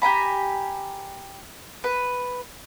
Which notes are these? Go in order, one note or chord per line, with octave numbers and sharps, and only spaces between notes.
G4 G#5 A#5 B5
B4